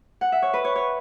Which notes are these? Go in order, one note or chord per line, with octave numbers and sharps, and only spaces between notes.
F#5
E5
C#5
B4
C#5
C#5